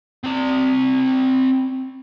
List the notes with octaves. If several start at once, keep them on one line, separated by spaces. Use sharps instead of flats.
C4 D5